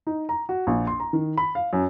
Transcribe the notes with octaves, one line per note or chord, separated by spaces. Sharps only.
D#4
A#5
F#4
A#1
C6
A#5
D#3
B5
F5
F#2